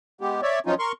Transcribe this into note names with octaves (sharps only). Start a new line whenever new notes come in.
G#3 B3 G4
C#5 D5 E5
F3 F#3 C#4 D#4 F4
A#4 C6 C#6